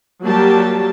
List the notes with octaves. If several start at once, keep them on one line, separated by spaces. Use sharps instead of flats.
F#3 G3 A#3 G4 A5